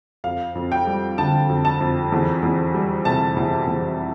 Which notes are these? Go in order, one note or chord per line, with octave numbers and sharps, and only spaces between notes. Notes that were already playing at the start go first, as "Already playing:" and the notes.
F2 F5
F2
G5
G3
D3 A5
F2
A5
F2
E2
E2
G3
C3 A5
E2
E2